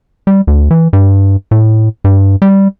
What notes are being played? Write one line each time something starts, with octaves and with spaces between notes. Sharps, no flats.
G3
D2
E3
G2
A2
G2
G3